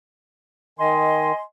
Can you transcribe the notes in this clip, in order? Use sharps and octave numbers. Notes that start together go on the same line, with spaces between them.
D#3 D#5 G#5 C6